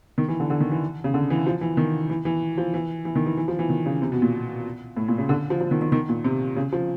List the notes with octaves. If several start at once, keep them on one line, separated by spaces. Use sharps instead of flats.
D#3
E3
D3
D3
D#3
E3
C#3
D3
E3
F3
E3
D#3
E3
E3
F3
E3
E3
D#3
E3
E3
F3
E3
D#3
C#3
C3
B2
A#2
A2
A#2
C#3
D3
F3
F3
D#3
D#3
D#3
A#2
C3
C#3
F3